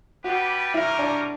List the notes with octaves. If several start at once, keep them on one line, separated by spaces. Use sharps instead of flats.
G3 B3 D4 F#4 G4 B4
G3 C#4 E4 G4 A#4
D4